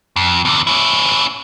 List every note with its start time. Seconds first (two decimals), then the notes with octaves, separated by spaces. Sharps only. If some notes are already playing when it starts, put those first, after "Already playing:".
0.16 F2
0.45 E2 D3
0.67 C#4 E4